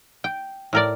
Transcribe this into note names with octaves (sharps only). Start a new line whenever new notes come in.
G5
A2 A#4 D5